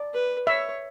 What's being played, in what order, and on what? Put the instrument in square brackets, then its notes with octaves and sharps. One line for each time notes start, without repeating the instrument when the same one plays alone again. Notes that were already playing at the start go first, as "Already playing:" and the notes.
Already playing: [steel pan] D5
[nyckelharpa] B4
[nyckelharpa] C#5 [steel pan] E5